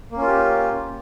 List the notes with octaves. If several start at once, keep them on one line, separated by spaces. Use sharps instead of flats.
A#3 C#4 F4 G4